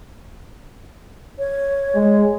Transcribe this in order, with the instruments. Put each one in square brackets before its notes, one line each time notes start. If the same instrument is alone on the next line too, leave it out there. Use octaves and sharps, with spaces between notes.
[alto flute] C#5
[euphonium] G#3